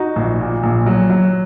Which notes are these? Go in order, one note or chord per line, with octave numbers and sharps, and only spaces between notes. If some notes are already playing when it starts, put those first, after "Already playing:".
Already playing: D#4 F#4
A#1
A#2
A#1
F#3
F#3